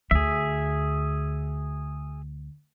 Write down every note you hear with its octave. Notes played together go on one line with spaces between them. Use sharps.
D2 G#4 E5